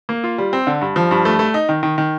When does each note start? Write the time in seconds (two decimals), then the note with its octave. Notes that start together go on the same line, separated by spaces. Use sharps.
0.09 A#3
0.24 F4
0.38 G3
0.53 C4
0.67 D3
0.81 G2
0.96 F3
1.11 G2
1.25 A3
1.39 A3
1.54 D#4
1.69 D#3
1.83 D#3
1.98 D#3